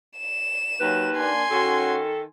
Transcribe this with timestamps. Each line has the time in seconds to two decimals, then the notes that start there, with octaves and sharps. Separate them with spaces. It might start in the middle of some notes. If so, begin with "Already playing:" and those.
0.18 E7
0.81 D#2 F#3 B4
1.16 A#3 D4 G#5 C6
1.51 D#3 C#4 F#4 A4